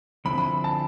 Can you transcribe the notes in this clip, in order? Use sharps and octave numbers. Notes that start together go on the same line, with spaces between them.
D3 F3 C4 E4 B5
B5
A5